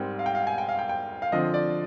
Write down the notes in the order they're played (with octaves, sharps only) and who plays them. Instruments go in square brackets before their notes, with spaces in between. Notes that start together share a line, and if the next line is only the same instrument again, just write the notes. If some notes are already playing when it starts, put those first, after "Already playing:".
Already playing: [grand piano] G#2 G3 C4 A#4 G5
F5
G5
F5
G#5
G5
F5
G5
G5
F5
D3 F3 C4 D#5
D5